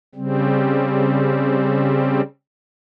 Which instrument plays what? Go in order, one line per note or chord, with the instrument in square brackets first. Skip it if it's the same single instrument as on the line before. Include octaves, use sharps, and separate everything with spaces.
[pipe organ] C#3 G3 C4